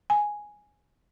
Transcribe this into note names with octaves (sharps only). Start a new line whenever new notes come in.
G#5